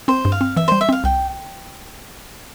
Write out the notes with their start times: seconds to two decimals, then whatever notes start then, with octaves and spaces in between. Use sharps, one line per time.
0.08 C4 C5
0.25 G2
0.32 F5
0.41 C4
0.57 E3 E5
0.68 G3 C5
0.81 E5
0.89 C4 F5
1.04 C2 G5